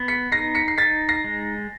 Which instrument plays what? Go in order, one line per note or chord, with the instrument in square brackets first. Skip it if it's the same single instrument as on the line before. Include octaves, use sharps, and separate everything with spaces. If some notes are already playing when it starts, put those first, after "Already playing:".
Already playing: [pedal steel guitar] B3
[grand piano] B6 C#7
[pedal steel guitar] D#4 [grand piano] A#6 C7
[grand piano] B6 C#7
C7
[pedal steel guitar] D#4 [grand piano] A6 B6
[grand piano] A#6 C7
[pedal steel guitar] G#3